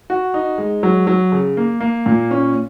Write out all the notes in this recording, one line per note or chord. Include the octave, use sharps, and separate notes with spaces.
F#4
D#4
G#3
F#3
F#3
C#3
A#3
A#3
A#2
C#4